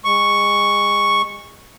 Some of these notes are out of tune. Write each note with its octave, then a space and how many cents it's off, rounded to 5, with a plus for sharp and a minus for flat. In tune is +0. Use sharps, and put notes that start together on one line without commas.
G#3 -30 C#6 +0